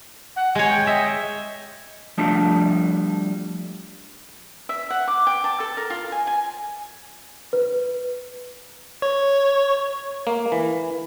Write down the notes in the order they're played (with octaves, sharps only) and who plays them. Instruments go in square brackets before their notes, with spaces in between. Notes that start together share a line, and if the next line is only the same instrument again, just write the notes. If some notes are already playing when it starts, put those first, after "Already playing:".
[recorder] F#5
[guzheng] G#3 C#5 [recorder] G#5
[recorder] G5
[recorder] D#5 [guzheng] E5
[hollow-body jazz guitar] F3 G3 A3 D4 G4
[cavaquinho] E5
F#5
D6
G5
A5
A4
A#4
F4
G#5
G#5
[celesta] B4
[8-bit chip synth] C#5
[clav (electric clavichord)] A#3
E3